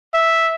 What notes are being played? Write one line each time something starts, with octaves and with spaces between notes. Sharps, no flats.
E5